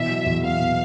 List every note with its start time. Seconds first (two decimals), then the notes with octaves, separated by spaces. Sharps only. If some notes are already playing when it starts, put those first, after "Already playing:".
Already playing: B2 E3 E5
0.09 F#3
0.26 E2
0.43 B3 F5
0.60 B2